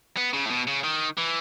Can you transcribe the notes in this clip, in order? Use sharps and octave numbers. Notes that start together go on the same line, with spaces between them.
B3
C#3
A2
B2
C#3
D#3
E3